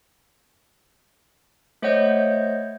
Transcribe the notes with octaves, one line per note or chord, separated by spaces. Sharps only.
A3 C5 C#5 D#5 F#5 G6